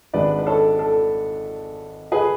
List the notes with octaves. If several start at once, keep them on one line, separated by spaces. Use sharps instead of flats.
G#1 G#2 G#3 D4 B4 D5
B4
A4 C#5
A4
G#4 B4